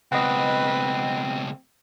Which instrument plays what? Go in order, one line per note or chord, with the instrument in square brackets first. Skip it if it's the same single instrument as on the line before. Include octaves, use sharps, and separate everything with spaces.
[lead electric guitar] C#2 B2 [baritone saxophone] C4 [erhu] B4 [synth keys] D#5 F#5